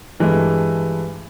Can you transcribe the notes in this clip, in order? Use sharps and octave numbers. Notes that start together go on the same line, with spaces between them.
G2 E3 G#3 A3